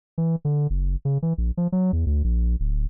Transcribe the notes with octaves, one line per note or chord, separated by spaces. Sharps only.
E3
D3
F#1
C#3
E3
A#1
F3
F#3
E2
D2
A#1
D1